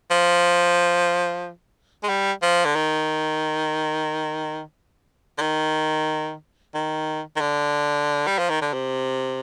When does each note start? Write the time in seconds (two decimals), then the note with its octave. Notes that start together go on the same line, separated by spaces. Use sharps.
0.11 F3
2.04 G#3
2.09 G3
2.42 F3
2.65 D3
2.75 D#3
5.38 D3
5.41 D#3
6.75 D#3
7.36 D#3
7.41 D3
8.27 G3
8.39 F3
8.50 D#3
8.62 D3
8.74 C3